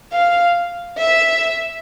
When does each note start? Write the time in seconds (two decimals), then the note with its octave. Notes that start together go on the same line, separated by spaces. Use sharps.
0.12 F5
0.97 E5